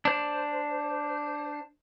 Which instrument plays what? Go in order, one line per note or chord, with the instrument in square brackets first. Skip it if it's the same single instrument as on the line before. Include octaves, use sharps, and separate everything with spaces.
[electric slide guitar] D4 C5